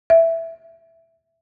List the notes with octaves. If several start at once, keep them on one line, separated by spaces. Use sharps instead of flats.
E5